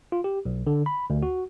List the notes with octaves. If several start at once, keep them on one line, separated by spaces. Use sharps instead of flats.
F4
G4
B1
D3
B5
D2
F#4